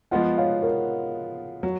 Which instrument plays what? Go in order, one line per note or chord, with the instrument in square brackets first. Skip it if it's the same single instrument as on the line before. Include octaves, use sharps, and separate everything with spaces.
[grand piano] F3 G#3 B3 F4 [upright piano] D#5 F#5
[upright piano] C#5 F5
A#4 C#5
[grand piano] F#3